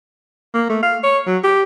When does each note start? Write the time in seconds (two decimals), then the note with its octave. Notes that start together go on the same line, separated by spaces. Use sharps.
0.54 A#3
0.69 A3
0.83 F5
1.03 C#5
1.27 F#3
1.44 G4